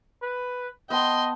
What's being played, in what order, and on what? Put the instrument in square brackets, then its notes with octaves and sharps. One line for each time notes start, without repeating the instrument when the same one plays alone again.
[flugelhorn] B4
[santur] B3 A5 [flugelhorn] D#5 [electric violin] G5 C6